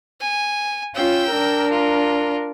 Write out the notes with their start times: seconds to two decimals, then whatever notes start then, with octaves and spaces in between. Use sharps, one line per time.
0.21 G#5
0.95 C#4 F4 G5 E6
1.32 D4 A#4
1.71 F4